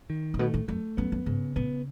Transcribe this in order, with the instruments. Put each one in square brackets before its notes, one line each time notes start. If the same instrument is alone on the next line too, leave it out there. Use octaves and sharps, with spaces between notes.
[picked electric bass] D#3
[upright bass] A2
[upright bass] B2 [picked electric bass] A3
[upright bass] A2
[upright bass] F#2 [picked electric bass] A3
[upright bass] F#2 [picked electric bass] B3
[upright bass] F#2
[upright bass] G#2 [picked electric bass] C#3
[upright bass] A2 [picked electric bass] B3